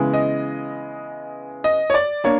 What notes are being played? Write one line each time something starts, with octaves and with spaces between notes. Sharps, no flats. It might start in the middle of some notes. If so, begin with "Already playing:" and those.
Already playing: C#3 E3 G#3 B3
D#5
D#5
C#5
D5
A#3 D4 C#5